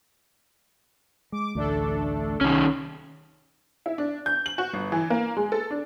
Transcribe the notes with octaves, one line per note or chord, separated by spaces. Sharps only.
G#3 D6
A1 D2 A3 D4 A4
C2 D#3 C#4
E4
D4
G6
F#7
F#4
G1
E3
A#3
G#3
A4
D4